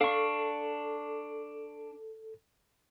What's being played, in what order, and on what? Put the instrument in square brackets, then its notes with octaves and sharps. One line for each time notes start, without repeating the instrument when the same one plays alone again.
[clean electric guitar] D4 [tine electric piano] A4 [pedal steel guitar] F5 C#6